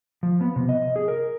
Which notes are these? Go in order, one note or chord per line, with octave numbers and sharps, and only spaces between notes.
F3
B3
C3
D#5
G#4
A#4